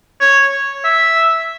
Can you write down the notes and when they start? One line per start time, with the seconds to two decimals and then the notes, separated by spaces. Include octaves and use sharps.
0.21 C#5
0.84 E5